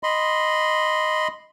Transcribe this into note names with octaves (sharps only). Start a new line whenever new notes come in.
D#5 B5 C6